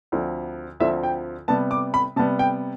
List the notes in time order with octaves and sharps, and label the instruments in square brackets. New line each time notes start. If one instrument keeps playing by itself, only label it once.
[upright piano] D2 D3 F3 C4
D2 D3 F3 C4 E5
G5
C3 G3 B3 A5
D6
B5
C3 G3 B3 A5
G5